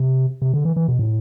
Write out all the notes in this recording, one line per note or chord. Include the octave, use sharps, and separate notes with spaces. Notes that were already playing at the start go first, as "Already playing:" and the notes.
Already playing: C3
C3
D3
E3
E3
B2
A2